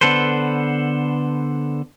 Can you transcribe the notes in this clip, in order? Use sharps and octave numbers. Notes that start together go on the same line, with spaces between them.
D3 B3 A4 B4 C5